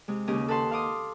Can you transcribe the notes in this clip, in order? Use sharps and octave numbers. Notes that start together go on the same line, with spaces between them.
C3 G#3
D#2 C#3 C#4 D#4 G4 D#5
A4 B4 F#5 A5 C6
F5 C6 D6 D#6